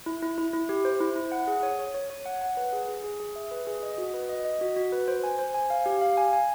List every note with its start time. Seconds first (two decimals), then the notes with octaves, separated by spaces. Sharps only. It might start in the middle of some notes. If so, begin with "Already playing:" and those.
0.06 E4
0.22 E4
0.38 E4
0.53 E4
0.69 G4
0.85 C5
1.00 E4
1.16 E4
1.32 F#5
1.47 G#4
1.63 C#5
1.79 C#5
1.94 C#5
2.10 C#5
2.26 F#5
2.42 F#5
2.57 B4
2.73 G#4
2.88 G#4
3.04 G#4
3.20 G#4
3.36 E5
3.51 B4
3.67 G#4
3.83 D#5
3.98 F#4
4.14 B4
4.29 D#5
4.45 D#5
4.61 F#4
4.76 F#4
4.92 B4
5.08 C5
5.24 G#5
5.39 C5
5.54 G#5
5.70 F5
5.86 G4
6.02 F5
6.17 G#5
6.33 G#5